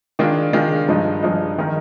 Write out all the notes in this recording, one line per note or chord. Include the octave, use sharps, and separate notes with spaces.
D#3 G#3 D4 F4
D#3 G#3 D4 F4
G2 F3 G#3 D#4
G2 F3 G#3 D#4
D#3 G#3 D#4 A#4